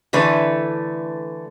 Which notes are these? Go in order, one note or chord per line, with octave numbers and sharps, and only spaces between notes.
D3 E3 A3 B4 D5